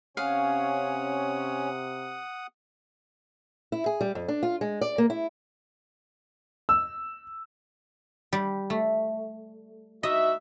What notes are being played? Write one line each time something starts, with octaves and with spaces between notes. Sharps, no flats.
C3 C#4 C#5 F5 F#5 D#6
E4
G#4
G3
F2
D4
F4
G#3
D5
A#3
E4
E6
G3
A3
D#4 F#4 D#5 E5